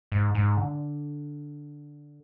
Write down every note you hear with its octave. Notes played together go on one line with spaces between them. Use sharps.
G#2
G#2
D3